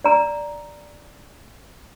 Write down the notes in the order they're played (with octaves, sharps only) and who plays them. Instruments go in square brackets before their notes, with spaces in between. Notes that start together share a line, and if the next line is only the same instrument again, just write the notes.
[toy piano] D5 A#5